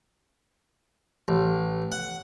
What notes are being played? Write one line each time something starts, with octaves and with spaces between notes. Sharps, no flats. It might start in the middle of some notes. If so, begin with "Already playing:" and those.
A1
F#5